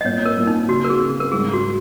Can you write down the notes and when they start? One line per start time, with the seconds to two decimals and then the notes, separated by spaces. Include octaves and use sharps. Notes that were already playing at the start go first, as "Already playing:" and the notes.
0.01 D#5
0.04 A#2 C#5
0.26 A#4
0.37 A#2
0.47 D#4
0.68 C#3 F#4
0.84 A#4
0.90 G#4
1.00 C#3
1.20 A#4
1.32 G#2 G#4
1.53 F#4